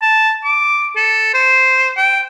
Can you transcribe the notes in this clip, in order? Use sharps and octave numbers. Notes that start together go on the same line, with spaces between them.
A5
D6
A4
C5
G5